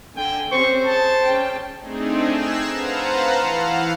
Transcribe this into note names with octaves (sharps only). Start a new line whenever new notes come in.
D3 G5 G#5
C4 C#4 G4 C5 C#6
G#4 A5
C#4 G#4 G5
A3 C4 D4 D#4 G#4
E6 F#6 G#6 A#6 C7 E7
B4 C5 F5 F#5 A5 A#5
E3 F5 F#5